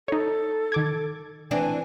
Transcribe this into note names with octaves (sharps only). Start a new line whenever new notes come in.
D#4 A4 C#5
D#3 D6 G#6
E3 C4 D4 G#5